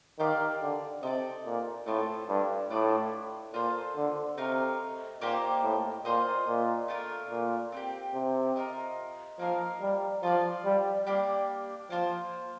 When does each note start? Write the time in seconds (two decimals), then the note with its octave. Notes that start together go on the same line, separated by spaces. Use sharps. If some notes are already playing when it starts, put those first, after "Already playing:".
0.19 D#3 G4 D5 F5
0.62 D3
1.03 C3 D#4 A4 D5
1.45 A#2
1.86 A2 A3 C4 F4 A4
2.29 G2
2.70 A2 D4 F4 A4 D5
3.54 A#2 F4 A4 C5
3.96 D3
4.37 C3 A3 D#4 A#4 F5
5.21 A#2 A#3 D#4 G4 C5
5.63 A2
6.05 A#2 F4 C5 D#5
6.47 A#2
6.88 A3 D4 F4 A#4
7.30 A#2
7.72 C4 D#4 G4
8.14 C3
8.56 F4 A#4 D#5
9.39 F3 A#3 D#4 A#4 F5
9.81 G3
10.23 F3 F4 A4 D5 F5
10.65 G3
11.07 G3 A#3 D4 G4
11.90 F3 A#3 F4 C5